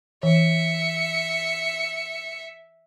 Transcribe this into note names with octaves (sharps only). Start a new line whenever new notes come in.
E3 E5 C#7